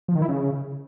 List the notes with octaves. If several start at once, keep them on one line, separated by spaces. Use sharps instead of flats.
F3
D#3
E4
C#3